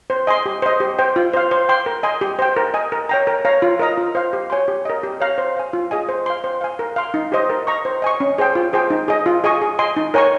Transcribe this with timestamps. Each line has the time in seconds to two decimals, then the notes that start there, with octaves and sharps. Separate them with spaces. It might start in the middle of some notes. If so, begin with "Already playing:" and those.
0.10 C5
0.27 D#5 G#5 C6
0.46 G4
0.62 C5 D#5
0.80 G4
0.99 C5 G5
1.16 F4
1.33 C5 F5
1.51 C5
1.69 G5 C6
1.86 A#4
2.03 D#5 G#5 C6
2.21 G4
2.39 C5 G5
2.57 A#4
2.74 D#5 G#5
2.92 A#4
3.09 C#5 G5 A#5
3.27 A#4
3.45 C#5 F5 A#5
3.62 F4
3.79 A#4 D#5 A#5
3.97 F4
4.15 C5 F5
4.33 G4
4.50 C#5 G#5 C6
4.68 G4
4.85 A#4 D#5
5.03 G4
5.20 C#5 F5 A#5
5.38 C5
5.57 F5 G#5
5.73 F4
5.91 G#4 D#5 G#5
6.09 C5
6.26 F5 C6
6.44 C5
6.61 F5 G#5
6.79 A#4
6.96 F5 C6
7.14 D#4
7.32 G4 C5 D#5
7.50 A#4
7.67 D#5 A#5 C#6
7.85 C5
8.02 D#5 G#5 C#6
8.20 C#4
8.38 G#4 C5 G5
8.55 F4
8.73 G#4 C5 G5
8.90 D#4
9.08 G#4 D#5
9.26 F4
9.44 G#4 D#5 G#5 C#6
9.62 G#4
9.79 D#5 G#5 C6
9.97 D#4
10.14 A#4 C#5 G#5 C#6